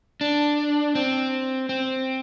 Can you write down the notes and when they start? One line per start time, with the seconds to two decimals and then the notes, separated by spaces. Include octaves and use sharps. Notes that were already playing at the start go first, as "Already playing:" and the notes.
0.21 D4
0.95 C4
1.69 C4